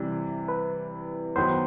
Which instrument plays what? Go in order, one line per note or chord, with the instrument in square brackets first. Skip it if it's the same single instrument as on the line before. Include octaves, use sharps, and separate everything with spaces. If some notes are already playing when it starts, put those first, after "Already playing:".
Already playing: [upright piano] C3 E3 G3
[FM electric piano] B4
[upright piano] D#3 F#3 B3 [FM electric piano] C5